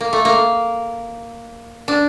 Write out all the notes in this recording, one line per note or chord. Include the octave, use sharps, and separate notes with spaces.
A#3
A3
A#3
D4